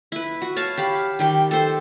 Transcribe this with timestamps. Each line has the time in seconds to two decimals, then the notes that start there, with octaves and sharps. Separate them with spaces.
0.12 E4 B4
0.42 F#4
0.57 C#5 F5 A5
0.78 G4 F5 B5
1.19 D#3 G4 G5
1.51 A4 C5